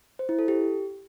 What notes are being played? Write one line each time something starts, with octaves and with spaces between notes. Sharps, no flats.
C5
E4
A4
G4